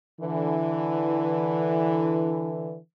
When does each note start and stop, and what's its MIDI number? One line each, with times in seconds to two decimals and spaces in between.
0.21 2.76 50
0.21 2.76 52